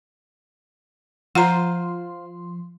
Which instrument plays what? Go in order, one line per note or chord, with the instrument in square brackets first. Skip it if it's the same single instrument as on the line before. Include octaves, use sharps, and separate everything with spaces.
[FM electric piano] F3 C6 [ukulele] F4 C5 [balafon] F#5 A#5